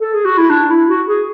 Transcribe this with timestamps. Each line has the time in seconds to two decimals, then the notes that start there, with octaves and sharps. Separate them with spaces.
0.01 A4
0.13 G#4
0.25 F#4
0.38 E4
0.50 D4
0.70 E4
0.89 F#4
1.08 G#4